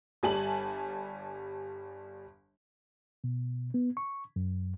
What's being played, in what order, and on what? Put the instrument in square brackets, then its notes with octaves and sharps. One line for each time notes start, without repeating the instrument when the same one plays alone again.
[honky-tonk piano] G1 G3 G#5 A5 F#7
[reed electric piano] B2
B3
C#6
F#2